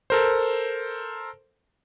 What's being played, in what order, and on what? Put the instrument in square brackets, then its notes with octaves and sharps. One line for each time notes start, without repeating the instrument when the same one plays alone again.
[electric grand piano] A4 A#4 C5